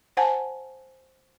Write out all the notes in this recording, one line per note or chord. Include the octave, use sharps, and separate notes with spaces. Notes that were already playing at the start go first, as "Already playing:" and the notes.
C5 F#5 G#5 A5